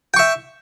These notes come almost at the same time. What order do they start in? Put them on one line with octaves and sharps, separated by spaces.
G5 C#6 E5